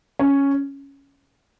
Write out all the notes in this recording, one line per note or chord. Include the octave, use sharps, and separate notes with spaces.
C#4